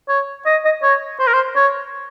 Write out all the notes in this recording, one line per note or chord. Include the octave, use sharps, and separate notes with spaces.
C#5
D#5
D#5
C#5
C5
A#4
C5
C#5